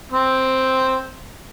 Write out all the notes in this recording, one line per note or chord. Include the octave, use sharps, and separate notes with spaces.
C4